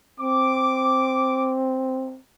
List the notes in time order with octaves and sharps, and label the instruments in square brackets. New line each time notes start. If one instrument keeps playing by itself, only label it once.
[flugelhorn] C4 [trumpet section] D6